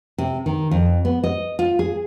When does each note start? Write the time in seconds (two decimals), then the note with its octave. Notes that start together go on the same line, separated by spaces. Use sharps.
0.18 C3
0.46 D#3
0.71 F2
1.05 B3
1.24 D#5
1.59 F4
1.79 G#4